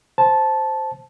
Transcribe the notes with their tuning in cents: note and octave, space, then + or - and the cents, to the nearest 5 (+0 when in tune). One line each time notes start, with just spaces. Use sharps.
C5 +0 A5 -10